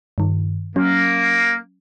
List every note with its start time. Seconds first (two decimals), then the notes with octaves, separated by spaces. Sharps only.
0.18 G2 D#3
0.76 F#3 A#3 C#4